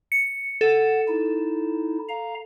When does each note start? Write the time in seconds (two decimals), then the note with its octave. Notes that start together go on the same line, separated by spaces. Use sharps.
0.12 C#7
0.61 A4 F#5
1.08 D#4 E4
2.09 F5 A#5